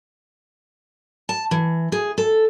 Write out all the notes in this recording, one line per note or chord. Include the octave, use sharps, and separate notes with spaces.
A5
E3
G#4
A4